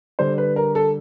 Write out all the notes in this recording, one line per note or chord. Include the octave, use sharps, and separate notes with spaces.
D3 G3 C5
B4
A#4
A4